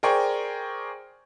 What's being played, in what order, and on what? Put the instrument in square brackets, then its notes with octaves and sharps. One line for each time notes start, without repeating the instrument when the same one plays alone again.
[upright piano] G#4 A#4 C5 D5 G5 C#6